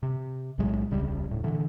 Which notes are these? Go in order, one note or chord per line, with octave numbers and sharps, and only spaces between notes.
C3
B1 A2 F#3 G#3
D#1 C2 C#3 G3
D#1 A2
A#2 D3 E3